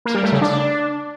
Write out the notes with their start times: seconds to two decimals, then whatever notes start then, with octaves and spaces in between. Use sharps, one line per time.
0.05 A#3
0.14 G3
0.23 A3
0.32 C#3
0.41 D4